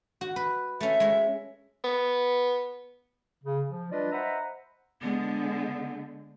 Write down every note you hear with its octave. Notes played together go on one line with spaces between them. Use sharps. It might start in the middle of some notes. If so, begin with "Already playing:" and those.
F#4
B4
A3 C#4 E5
G#3 C#5
B3
C#3
F3
G3 D4 F4 B4 D5 D#5
C5 D#5 E5 F#5 A#5 B5
D3 G#3 B3